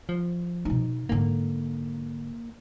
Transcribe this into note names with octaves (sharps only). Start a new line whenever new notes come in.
F3
B2 D#4
G#2 D3 A#3